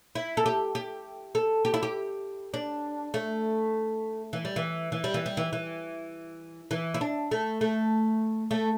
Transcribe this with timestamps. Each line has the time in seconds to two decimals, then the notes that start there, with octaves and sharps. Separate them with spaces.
0.15 E4
0.37 A4
0.46 G4
0.75 G4
1.35 A4
1.65 G4
1.74 E4
1.83 G4
2.54 D4
3.14 A3
4.33 E3
4.45 G3
4.56 E3
4.92 E3
5.04 G3
5.14 E3
5.26 G3
5.37 E3
5.53 E3
6.71 E3
6.94 E4
7.01 D4
7.31 A3
7.61 A3
8.51 A3